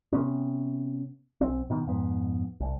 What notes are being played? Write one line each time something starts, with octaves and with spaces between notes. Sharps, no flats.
C3 B3 C#4
B1 C4
B2 D#3 B3
F2 G#2 B3
C2